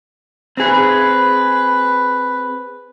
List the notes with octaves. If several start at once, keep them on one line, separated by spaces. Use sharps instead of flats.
C4 G#4 B4